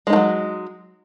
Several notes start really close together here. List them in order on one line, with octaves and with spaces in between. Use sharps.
G#3 D#4 F3 F#3